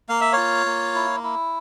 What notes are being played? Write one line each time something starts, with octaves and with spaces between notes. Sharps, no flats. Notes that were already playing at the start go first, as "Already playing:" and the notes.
A#3 F5
E5
F4 C#5 F5
A#3
E4
E4